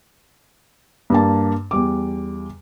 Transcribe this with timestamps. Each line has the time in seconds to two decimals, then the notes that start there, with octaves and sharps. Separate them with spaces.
1.10 G2 A#3 A5
1.71 E2 G3 D6